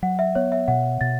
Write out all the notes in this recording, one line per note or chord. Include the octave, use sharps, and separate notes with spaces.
F#3 F#5
E5
B3 C#5
E5
B2 F#5
B2 A6